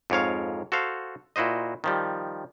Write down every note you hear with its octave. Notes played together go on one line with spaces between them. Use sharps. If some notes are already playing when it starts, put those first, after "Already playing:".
F2 G#2 C#5 F5
F#4 A4 C5 F5
A#2 E4 F#4 C5 D#5
D#3 F3 G3